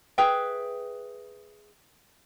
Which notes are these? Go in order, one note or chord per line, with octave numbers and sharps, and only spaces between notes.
G#4 B4 E5 G5